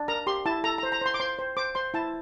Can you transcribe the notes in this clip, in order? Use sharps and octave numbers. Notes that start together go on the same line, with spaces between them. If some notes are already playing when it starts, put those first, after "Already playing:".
Already playing: D4
A#4 A#5
G4 C6
E4 A5
A4 A#5
A#5
C5
A#5
C5 C6
D6
C5 C6
C5
C5 D6
C5 C6
E4 A5